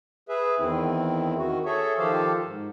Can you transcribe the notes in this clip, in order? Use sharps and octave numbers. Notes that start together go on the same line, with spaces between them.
G#4 B4 E5
E2 D#3 C4 E4
D#3 F#4
G#4 A4 C#5 E5
D#3 F3 G4 A4 C5 F5
G#2